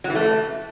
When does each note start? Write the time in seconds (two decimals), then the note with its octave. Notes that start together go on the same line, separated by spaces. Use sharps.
0.04 F#3
0.10 E3
0.15 A3